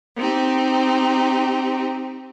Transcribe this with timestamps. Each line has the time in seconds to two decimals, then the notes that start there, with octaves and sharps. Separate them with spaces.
0.16 C4 D#4 G4